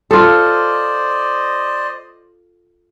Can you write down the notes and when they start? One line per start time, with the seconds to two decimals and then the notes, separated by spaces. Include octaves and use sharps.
0.11 F4 A4 C5 D5 D#5